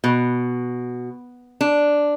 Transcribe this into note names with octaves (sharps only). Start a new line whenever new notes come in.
B2
D4